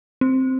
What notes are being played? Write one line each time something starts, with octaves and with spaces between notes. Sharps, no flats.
C4